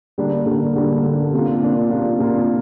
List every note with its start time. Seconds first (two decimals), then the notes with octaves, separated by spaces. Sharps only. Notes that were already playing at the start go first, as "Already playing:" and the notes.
0.18 D3 G3 A#3 D4
0.46 D3 G3 A#3 D4
0.76 D3 G3 A#3 D4
1.04 D3 G3 A#3 D4
1.34 C3 A#3 D4 F4
1.62 C3 A#3 D4 F4
1.90 C3 A#3 D4 F4
2.19 C3 A#3 D4 F4